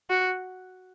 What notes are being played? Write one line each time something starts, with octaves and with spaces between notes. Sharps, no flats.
F#4